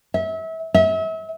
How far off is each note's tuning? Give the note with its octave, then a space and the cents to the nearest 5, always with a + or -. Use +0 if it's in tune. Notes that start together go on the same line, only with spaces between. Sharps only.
E5 -30
E5 -35